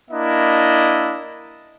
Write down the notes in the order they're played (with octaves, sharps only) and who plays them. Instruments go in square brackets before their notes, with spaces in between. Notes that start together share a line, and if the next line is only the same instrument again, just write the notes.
[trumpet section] A#3 D4 E4 D#5